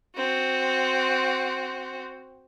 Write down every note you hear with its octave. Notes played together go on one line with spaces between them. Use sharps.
C4 F#4